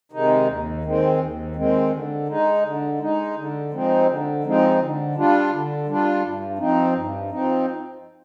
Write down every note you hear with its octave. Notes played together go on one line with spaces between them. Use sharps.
C3 D#3 G#3 D#4
D#2
D#3 G#3 C4
D#2
D#3 G#3 C4
D3
G#3 D#4
D3
G#3 D#4
D3
F3 G#3 C4 D#4
D3
F3 G#3 C4 D#4
D3
G3 D4 F4
D3
G3 D4 F4
G2
F3 C4 D#4
G2
F3 C4 D#4